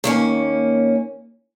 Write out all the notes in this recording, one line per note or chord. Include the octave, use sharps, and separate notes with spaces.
D#2 A#3 C#4